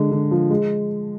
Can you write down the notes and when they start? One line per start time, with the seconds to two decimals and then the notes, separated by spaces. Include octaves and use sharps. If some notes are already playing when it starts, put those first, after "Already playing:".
Already playing: D3 G#3
0.11 D3
0.31 F3
0.50 G#3